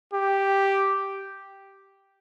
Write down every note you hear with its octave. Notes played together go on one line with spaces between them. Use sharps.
G4